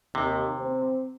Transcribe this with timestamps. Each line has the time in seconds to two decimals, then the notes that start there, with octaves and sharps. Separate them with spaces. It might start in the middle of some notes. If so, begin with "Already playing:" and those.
0.15 D#2 C3
0.57 C4